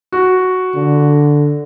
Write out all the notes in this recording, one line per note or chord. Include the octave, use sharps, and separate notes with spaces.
F#4
D3